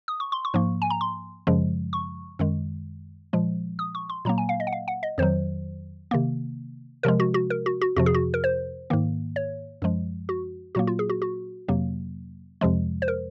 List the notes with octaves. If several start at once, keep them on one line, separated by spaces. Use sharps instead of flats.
D#6
C#6
C6
C#6
G#2 F3 A#3
G#5
A#5
C6
F#2 C#3 F3 G#3
C#6
F#2 D#3 G#3
A#2 F3 G#3
D#6
C#6
C6
A#2 F#3 A#3 A#5
G#5
F5
D#5
F#5
F5
F#5
D#5
F2 D#3 F#3 C5
C3 D#3 A#3
C3 F3 G#3 A#4
F#4
F#4
A#4
F#4
F#4
F2 C3 F3 F#4
G#4
F#4
A#4
C5
G#2 D#3 A#3
C#5
F#2 F3 G#3
F#4
A#2 F#3 A#3 F#4
F4
G#4
F#4
F#4
F2 C3 F#3 A#3
F2 C3 F3 G#3
C5
A#4